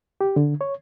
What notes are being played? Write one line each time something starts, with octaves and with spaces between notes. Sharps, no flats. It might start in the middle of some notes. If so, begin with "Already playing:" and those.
G4
D3
C#5